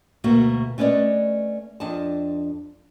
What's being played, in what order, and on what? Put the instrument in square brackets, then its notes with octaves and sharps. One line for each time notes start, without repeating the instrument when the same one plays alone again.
[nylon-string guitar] D2 B2 A3 A#3 F#4 E5
A3 C#4 B4 C5 D5 D#5
F2 D4 D#5 A5